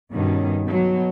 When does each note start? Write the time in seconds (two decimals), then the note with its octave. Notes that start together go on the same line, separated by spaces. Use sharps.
0.11 G2 B2 D#3 C#4
0.65 B2 F#3